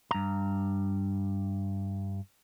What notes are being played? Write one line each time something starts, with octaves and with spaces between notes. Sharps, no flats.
G2 A#5